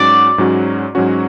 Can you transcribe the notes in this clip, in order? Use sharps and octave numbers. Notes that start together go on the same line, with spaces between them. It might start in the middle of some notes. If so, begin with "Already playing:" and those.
Already playing: G#2 F#3 C#4 F#4 D5
G#2 F#3 C#4 F#4
G#2 F#3 C#4 F#4